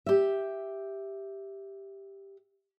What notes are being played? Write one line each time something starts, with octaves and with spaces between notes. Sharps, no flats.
G4 E5